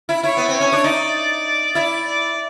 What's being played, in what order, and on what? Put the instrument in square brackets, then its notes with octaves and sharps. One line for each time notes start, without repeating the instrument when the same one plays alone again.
[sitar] E4
[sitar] E4 [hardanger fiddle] C#5
[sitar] B3
C4
[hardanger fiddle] C#5
[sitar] C#4
D4
[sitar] D#4 [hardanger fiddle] D5
[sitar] E4 [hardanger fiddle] D5
[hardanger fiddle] D5